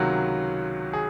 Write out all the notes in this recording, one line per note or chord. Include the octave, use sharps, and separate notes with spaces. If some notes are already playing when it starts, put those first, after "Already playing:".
Already playing: C#2 C3 D#3 F#3 F#4
G#4